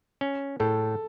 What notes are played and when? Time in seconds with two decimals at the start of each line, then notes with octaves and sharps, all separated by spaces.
0.21 C#4
0.60 A2 A4